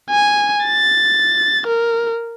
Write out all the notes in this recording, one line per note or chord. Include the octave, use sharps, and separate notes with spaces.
G#5
A6
A#4